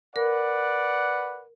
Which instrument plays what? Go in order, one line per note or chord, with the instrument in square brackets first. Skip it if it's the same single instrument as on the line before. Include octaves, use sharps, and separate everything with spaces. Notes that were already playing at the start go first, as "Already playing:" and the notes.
[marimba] A#4 [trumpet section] B4 D5 F#5